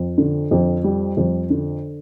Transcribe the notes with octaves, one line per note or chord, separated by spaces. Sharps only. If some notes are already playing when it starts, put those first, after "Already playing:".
Already playing: F2
D3
F2
G3
F2
D3